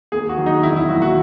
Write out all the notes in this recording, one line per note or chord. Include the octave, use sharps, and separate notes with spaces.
D#2 G#4
F#4
D#3 F#3
D#4
E1 E4
E4
D#2 D#3 F#3 F#4
F#4